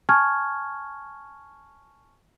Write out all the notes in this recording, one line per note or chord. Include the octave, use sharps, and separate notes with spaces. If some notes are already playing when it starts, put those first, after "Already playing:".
G#5 A5 C#6 F6 G#6